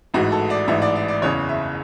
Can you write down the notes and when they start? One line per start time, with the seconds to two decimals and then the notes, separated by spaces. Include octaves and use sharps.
0.14 A1 G#2 E3 F#4
0.32 A4
0.50 D5
0.68 A1 G#2 E3 E5
0.82 D5
0.95 D5
1.08 D5
1.22 F#1 E2 C#3 C#5
1.49 E5